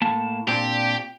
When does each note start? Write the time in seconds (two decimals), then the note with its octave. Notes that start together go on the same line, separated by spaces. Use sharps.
0.02 A2 A#3 A5
0.48 A#2 C4 D4 G4